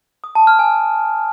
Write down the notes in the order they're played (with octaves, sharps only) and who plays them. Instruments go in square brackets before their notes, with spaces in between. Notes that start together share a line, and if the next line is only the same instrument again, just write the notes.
[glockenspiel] D#6
A5
F6
G#5